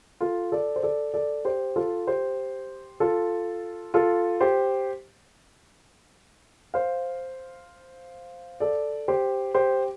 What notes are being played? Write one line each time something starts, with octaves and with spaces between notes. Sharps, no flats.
F4 A4
A4 D5
C5
A4 D5
A4 D5
G4 C5
F4 A4
G4 C5
F4 A4
F4 A4
G4 C5
C5 F5
A4 D5
G4 C5
G4 C5